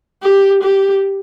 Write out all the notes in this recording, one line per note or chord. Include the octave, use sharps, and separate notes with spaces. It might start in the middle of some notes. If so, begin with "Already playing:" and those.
G4
G4